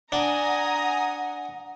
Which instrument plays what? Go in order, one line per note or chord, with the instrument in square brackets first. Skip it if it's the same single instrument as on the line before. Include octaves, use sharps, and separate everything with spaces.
[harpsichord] D4 [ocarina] F#5 [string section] G#5 A#5 D#6